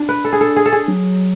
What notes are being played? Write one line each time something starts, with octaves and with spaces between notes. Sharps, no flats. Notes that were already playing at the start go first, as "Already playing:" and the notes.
Already playing: D4
B4
A4
G#4
A4
G#4
A4
G#4
F#3